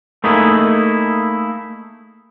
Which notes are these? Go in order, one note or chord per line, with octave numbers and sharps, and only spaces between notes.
A3 A#3 D#4 E4 G#4